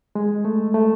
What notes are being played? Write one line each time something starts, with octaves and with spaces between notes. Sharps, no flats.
G#3
A3
A3